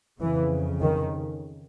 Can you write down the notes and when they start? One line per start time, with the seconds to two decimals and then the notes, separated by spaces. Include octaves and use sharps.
0.20 F2 C#3 E3
0.82 D#3